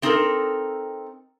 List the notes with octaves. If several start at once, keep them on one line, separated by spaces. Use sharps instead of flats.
A3 C4 D#4 F#4 A4 A#4